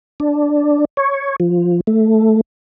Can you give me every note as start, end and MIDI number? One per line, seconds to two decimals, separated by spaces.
0.20 0.85 62
0.97 1.36 73
1.40 1.80 53
1.87 2.41 57